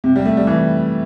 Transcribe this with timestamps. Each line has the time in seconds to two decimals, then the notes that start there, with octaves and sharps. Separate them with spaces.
0.04 C3
0.16 G3
0.25 A3
0.37 G3
0.47 E3